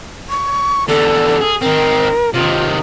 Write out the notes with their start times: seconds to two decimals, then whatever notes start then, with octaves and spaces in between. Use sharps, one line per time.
0.29 C#6
0.88 E2 D3 A4
1.41 G#4
1.62 D#3 C4 A#4
2.34 C3 D#3 F4